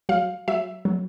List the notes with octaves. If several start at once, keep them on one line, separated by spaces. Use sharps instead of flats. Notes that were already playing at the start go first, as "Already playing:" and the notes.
F#3 F5
F#3 E5
F#3